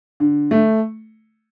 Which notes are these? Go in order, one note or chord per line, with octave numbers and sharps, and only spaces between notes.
D3
A3